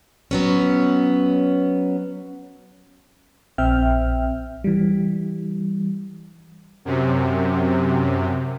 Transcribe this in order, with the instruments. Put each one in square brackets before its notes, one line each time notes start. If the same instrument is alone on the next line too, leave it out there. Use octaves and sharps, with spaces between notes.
[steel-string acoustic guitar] F#3 B3 C#4
[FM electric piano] A#1 C4 E5 G5 F6
E3 G3
[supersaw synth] F#2 C3